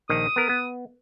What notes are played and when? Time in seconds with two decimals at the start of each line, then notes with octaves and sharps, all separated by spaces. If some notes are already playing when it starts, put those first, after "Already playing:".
0.09 A#1 D#3 D#6
0.36 B3 A#4
0.49 B3